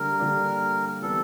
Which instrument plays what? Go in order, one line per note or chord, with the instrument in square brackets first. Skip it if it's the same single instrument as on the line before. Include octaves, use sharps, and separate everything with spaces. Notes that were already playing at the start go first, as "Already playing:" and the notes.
Already playing: [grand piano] D3 G3 A#3 D4 G4 [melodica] A#4
[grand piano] D3 G3 A#3 D4 G4
[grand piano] E3 G3 B3 [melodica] A4